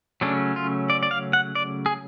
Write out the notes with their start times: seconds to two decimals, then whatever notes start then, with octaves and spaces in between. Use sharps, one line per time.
0.21 C#3 F#3 A3 C#4 D4
0.56 F4
0.90 D5
1.03 D5
1.11 F5
1.33 F#5
1.55 D5
1.86 G#4